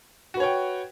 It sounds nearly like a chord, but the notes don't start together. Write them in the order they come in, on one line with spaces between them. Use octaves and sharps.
F#4 B4 C#5 G5